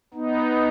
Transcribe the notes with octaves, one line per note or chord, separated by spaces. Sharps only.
B3 D#4